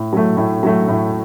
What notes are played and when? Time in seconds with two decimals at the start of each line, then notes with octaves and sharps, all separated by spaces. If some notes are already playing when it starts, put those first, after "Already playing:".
Already playing: A2
0.13 F#3 A3
0.37 A2
0.63 F#3 A3
0.88 A2